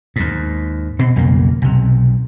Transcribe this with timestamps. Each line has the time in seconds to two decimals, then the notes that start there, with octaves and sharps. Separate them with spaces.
0.16 D#2 G#2
0.99 B2 C4
1.16 B1 F2 C#3 A#3
1.62 B1 C3